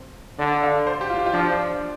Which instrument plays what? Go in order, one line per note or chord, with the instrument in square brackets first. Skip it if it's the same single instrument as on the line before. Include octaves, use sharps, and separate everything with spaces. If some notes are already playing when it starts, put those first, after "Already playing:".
Already playing: [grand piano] C4
[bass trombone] D3 [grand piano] D5
[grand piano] F5
C5
G4
F4
G4
F4
[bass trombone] F3 [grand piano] D4